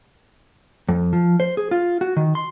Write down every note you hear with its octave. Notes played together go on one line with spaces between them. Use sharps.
F2
F3
C5
G#4
F4
F#4
D#3
C6